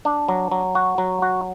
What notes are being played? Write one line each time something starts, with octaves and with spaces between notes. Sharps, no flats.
D4
F#3
F#3
F#4
F#3
F#4